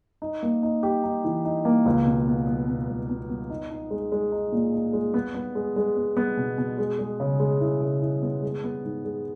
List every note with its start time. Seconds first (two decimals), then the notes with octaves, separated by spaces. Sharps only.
0.22 D#4
0.43 A#3
0.63 D#4
0.83 G4
1.03 D#4
1.25 E3
1.45 D#4
1.65 A#3
1.86 C#2
2.06 B2
2.27 B3
2.47 B3
2.68 B2
2.88 C#2
3.09 B2
3.30 B3
3.50 D#4
3.71 D#4
3.91 G#3
4.12 G#3
4.32 D#4
4.52 A#2
4.73 D#4
4.93 G#3
5.14 B3
5.34 B3
5.55 G#3
5.76 G#3
5.96 B3
6.17 B3
6.37 B2
6.58 B2
6.78 G#3
6.99 G#3
7.20 C#3
7.40 G#3
7.61 E4
7.81 C#3
8.01 E4
8.22 B3
8.42 G#3
8.64 B3
8.84 G#2
9.04 G#3